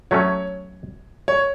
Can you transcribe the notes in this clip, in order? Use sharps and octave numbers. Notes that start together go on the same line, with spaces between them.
F#3 A3 C#4 C#5
C#5